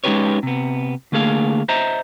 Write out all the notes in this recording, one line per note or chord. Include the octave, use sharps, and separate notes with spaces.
G#3 C#4 D#4 G4 B4 C#5
C3 B3
D3 A3 A#3 G#4 F5
C5 D#5 E5 A#5